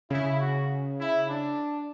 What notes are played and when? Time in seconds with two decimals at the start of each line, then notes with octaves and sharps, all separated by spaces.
0.10 C#3 E4
0.40 F#4
0.98 E4
1.28 D4